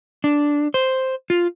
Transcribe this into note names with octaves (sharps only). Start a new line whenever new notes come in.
D4
C5
F4